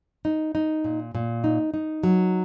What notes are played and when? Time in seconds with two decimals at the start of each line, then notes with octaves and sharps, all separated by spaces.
0.25 D#4
0.55 D#4
0.84 A#2
1.15 A#2
1.44 D#4
1.74 D#4
2.03 F#3